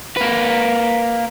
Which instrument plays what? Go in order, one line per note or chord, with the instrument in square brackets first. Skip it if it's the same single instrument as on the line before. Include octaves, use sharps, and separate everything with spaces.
[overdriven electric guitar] A#3 B4